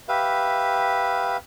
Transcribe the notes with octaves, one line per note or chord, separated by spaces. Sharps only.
G4 B4 E5 F5